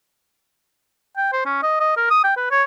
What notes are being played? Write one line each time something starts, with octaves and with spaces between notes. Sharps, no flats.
G5
C5
C#4
D#5
D#5
A#4
D#6
G5
B4
C#5